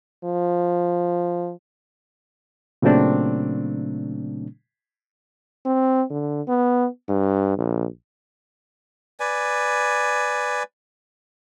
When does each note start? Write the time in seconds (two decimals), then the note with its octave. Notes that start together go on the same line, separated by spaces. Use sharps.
0.24 F3
2.82 A#2 C#3 F#3 A3 C4 D4
5.66 C4
6.10 D3
6.48 B3
7.09 G2
7.58 A#1
9.20 B4 D5 G#5